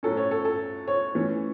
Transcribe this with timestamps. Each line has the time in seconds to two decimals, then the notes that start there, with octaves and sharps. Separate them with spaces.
0.03 A2 F#3 C#4 A4
0.17 C#5
0.31 A4
0.45 A4
0.88 C#5
1.15 E3 A3 C#4